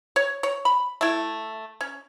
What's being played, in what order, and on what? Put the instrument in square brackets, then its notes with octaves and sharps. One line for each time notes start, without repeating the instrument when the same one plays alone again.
[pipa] C#5
C#5
B5
A3 E4
C#4